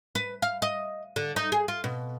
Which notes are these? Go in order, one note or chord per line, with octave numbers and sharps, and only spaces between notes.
B4
F5
D#5
D3
D#4
G#4
F4
B2